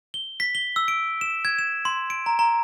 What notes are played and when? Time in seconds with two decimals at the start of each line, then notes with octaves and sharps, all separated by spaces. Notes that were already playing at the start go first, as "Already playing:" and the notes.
0.14 G7
0.40 B6
0.55 G7
0.76 E6
0.88 D7
1.21 E7
1.45 G#6
1.59 E7
1.85 C6
2.10 D7
2.26 A#5
2.39 A#5